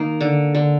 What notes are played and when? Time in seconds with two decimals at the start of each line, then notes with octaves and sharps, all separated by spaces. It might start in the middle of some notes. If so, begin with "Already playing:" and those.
Already playing: D#3 A#3
0.21 D3
0.55 D3